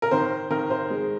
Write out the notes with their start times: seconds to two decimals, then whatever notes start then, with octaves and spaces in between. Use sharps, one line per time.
0.02 A#4
0.11 D#3 C5
0.50 D#3 A#4
0.70 C5
0.90 G#3